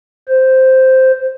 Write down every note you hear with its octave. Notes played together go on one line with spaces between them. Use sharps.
C5